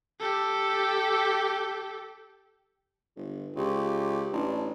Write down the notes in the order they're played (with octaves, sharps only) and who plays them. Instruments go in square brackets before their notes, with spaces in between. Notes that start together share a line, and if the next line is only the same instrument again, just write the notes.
[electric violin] G4 A4
[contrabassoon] G1
[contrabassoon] C#2 [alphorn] G4
[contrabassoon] A1 [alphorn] D4